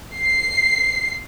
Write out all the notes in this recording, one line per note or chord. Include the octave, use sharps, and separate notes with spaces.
C7